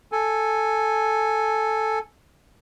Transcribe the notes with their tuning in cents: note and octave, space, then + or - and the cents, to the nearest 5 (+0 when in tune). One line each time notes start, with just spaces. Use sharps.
A4 +0 G#5 +0